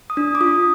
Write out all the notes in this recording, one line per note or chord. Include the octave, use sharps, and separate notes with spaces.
D#6
D4
D6
F4 D#6